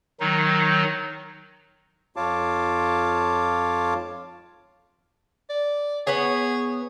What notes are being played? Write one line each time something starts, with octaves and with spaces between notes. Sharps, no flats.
D#3 F#3 D#4
F2 F4 C#5 F5 A5 D6
D5
B3 G#4 C#5